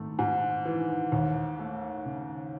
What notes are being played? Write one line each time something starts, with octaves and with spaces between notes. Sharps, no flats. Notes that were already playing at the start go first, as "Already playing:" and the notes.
Already playing: G#1 A3
G#2
E3
D#2
A3
C#3